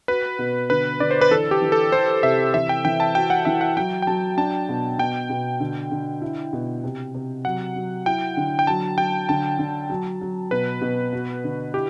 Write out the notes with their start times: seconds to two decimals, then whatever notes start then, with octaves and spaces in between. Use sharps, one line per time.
0.08 F#4 B4
0.39 B2
0.70 D3 B4
1.00 D3 D5
1.11 C5
1.21 B4
1.31 E3 A4
1.51 G4
1.62 E3
1.72 A4
1.92 E4 C5
2.23 C3 E5
2.54 E3 E5
2.69 G5
2.85 E3 G5
3.00 A5
3.15 F#4 G5
3.30 F#5
3.45 E3 E5
3.61 F#5
3.77 F#3 G5
4.02 G5
4.07 F#3 A5
4.37 D4 A5
4.69 B2
4.99 B2 G5
5.30 B2
5.60 D3
5.91 D3
6.22 E4
6.53 B2
6.84 C3
7.15 C3
7.45 F#3 F#5
7.76 F#3
8.06 E4 G5
8.37 D3
8.59 G5
8.67 F#3 A5
8.98 F#3 G5
9.29 D3 A5
9.59 D3
9.89 F#3
10.21 F#3
10.51 B2 B4
10.82 B2
11.13 F#4
11.44 D3
11.74 E4 G4